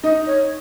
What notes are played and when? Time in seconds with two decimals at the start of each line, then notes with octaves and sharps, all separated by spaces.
0.04 D#4 D#5
0.27 C#5